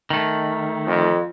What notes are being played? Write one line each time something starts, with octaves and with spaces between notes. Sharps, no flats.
D#3 A3
F2